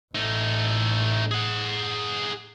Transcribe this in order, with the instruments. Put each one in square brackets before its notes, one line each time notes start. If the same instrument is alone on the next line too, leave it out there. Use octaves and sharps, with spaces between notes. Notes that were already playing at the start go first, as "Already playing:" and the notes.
[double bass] A1 [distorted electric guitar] A3 D#4
[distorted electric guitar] G#4 F#5